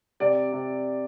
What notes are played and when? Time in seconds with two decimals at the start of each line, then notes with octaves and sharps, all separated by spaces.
0.20 C3 D5
0.52 C3